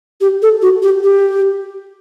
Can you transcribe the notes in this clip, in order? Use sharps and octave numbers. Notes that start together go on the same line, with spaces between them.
G4
A4
F#4
G4
G4